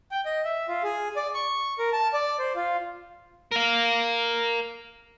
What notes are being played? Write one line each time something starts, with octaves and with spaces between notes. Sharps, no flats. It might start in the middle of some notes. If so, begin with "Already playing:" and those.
G5
D#5
E5
F4
G#4
D5
C#6
A#4
A5
D5
C5
F4
A#4 F5